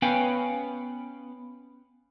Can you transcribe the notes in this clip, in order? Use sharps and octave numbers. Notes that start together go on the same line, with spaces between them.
B3 C#4 B4 F5 G5 G#5